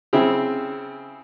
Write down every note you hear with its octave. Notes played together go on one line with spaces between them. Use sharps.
C#3 C4 E4